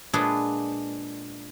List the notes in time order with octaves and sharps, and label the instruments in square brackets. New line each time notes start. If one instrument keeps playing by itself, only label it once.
[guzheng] A#2 G#3 D4 F4 G#4 B4